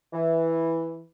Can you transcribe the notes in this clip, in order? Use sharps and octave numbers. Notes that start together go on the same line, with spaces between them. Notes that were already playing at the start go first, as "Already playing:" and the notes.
E3